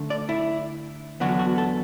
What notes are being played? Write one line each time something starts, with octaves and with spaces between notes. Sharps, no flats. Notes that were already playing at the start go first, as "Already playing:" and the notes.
Already playing: D3 A3 D4
D5
E4
E2 D3 F#3 B3 D4 F#4
F#4
A4